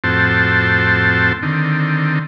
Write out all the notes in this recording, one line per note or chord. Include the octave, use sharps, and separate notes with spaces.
F2 A2 C4 F#4 C5 A5
D3 D#3 C4